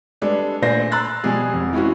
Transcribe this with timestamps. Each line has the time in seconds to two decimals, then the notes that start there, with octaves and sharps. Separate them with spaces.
0.22 G3 G#3 D4 A4 B4
0.62 A#2 A3 D4 C5 G#5 A#6
0.92 A#5 C6 E6 F#6 A6
1.24 B2 F3 G3 G#3 G#4
1.53 F1 F2
1.73 E3 G#3 C#4 E4 F#4